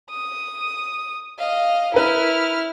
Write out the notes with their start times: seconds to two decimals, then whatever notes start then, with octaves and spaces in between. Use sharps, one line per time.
0.10 D#6
1.38 D#5 F5
1.94 E4 A#4 B4 F6